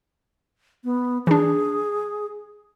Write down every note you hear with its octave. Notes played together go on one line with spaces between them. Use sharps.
B3
E3 D4 G#4